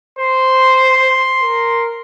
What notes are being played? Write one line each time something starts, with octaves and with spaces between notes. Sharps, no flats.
C5 C6
A#4